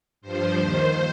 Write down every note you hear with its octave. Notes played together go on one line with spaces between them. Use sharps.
G2 F3 C5
D#2 D#3 C5